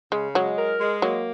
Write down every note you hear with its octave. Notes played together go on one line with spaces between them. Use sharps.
C#3 G#3
F#3 G#3
A#4
G#3
F#3 A#3